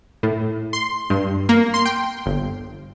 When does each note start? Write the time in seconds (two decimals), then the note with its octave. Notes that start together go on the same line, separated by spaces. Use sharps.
0.23 A2
0.73 C6
1.10 G2
1.49 A#3
1.74 C6
1.85 G5
2.26 G1